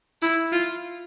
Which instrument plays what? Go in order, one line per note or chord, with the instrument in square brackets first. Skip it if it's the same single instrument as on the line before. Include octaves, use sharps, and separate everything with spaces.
[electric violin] E4
F4